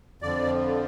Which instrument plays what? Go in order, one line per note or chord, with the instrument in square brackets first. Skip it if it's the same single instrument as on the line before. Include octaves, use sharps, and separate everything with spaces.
[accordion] F2 D3 F3 D5